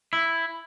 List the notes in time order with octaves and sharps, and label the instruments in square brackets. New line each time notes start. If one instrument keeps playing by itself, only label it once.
[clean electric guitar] E4